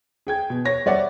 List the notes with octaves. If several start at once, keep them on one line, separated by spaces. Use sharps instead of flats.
G#4 G5 G#6
B2
C#5 A#6
G3 C#5 D5 E5 F#5